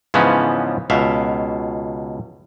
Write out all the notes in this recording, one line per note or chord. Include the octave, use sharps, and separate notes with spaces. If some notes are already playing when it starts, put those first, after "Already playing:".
G#2 C#3 E3 F3 B3 C#4
C#2 B2 E5 F5